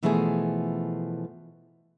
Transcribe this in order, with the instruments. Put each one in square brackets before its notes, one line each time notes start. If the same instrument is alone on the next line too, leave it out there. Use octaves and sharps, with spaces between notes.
[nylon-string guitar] B2 E3 F3 A3 G#4 G#5